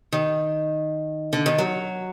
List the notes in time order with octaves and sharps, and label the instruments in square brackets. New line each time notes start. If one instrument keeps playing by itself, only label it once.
[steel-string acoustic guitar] D#3
D3
D#3
F#3